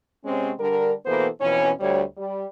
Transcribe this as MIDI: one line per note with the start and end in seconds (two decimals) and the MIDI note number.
0.24 0.51 48
0.24 0.51 56
0.24 0.51 60
0.24 0.51 61
0.59 0.92 50
0.59 0.92 55
0.59 0.92 62
0.59 0.92 70
1.05 1.27 47
1.05 1.27 52
1.05 1.27 58
1.05 1.27 59
1.05 1.27 69
1.05 1.27 72
1.40 1.71 41
1.40 1.71 47
1.40 1.71 52
1.40 1.71 61
1.80 2.02 38
1.80 2.02 55
1.80 2.02 73
2.17 2.45 55